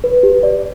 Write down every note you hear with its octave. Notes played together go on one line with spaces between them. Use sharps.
B4
G4
D5